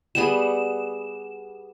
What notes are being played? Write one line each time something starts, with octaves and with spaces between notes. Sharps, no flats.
G3 B3 G#4 E7